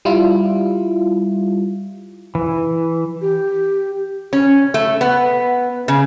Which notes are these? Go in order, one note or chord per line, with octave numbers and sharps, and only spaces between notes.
G3 E4 F4
E3
G4
C#4
A3
B3
C#3